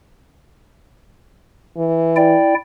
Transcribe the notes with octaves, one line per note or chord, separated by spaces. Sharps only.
E3
E4 D5 G5